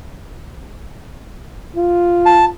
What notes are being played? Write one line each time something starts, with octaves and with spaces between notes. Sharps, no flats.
F4
A5